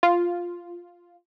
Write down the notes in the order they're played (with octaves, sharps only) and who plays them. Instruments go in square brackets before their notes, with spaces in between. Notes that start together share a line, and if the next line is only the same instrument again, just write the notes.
[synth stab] F4